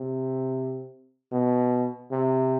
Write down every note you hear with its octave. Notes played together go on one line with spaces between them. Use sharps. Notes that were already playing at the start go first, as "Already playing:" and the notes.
Already playing: C3
B2
C3